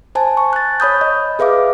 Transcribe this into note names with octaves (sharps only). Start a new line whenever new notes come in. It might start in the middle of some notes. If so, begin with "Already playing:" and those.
C5 G#5 A5
C#6
F#6 A6
C#5 B5 D#6 G6
D#5
G#4 B4 E5 F5 D6